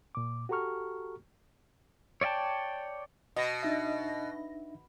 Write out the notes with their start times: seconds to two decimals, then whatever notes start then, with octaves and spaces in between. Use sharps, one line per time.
0.15 A#2 D6
0.49 F#4 G4 A4 A#5 C#6 F6
2.21 C#5 D5 E5 G5 A5
3.36 B2 D#5 A#6
3.63 D4 D#4 E5